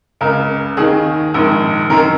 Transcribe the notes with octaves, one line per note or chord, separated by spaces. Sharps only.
C#2 C#3 A#4
D#2 D#3 G#4
A#1 G#2 D#3
F#2 D#3 A#4